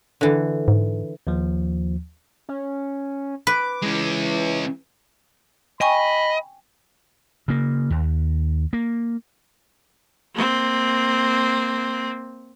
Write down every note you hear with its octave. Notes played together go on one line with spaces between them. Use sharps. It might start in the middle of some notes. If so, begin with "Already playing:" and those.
D3 E3
G#2
D#2 F3
C#4
B4 D6
E3 G#3 C#4
D#5 G5 G#5 B5 C#6
C#3 A#3
D#2
A#3
A#3 C4